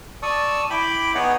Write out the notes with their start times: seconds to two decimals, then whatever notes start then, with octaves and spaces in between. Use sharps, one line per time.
0.23 D5 A5 C#6 D#6 E6
0.70 E4 G5 B5 D6
1.15 B3 D#4 G#4 C#5 D#5 F#5